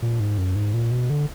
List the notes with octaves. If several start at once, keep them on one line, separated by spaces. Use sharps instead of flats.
A#2
G#2
F#2
G#2
A#2
B2
D3